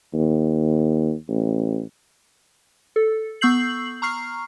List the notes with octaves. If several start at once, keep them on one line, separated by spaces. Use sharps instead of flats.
D#2
A1
A4
B3 C#6 E6 G6 C7 F#7
A#5 C#6 F6 C7